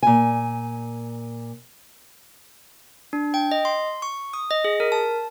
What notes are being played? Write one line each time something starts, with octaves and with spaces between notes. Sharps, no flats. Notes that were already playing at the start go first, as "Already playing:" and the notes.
A#2 G#5
D4
G5
D#5
C6
C#6
D#6
D#5
G#4
A#4
A5